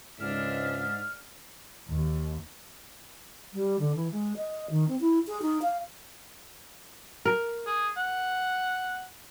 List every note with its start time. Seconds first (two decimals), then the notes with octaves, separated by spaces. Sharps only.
0.20 C#2 G#2 D4 E5 F6
1.90 D#2
3.53 G3
3.79 D3
3.95 E3
4.12 G#3
4.36 D#5
4.70 D#3
4.88 C4
5.00 E4
5.27 G#4
5.42 D#4
5.62 F5
7.25 A#4
7.67 G#4
7.97 F#5